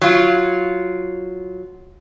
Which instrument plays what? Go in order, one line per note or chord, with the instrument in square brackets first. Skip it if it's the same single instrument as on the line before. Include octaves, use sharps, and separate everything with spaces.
[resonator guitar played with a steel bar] F#3 F4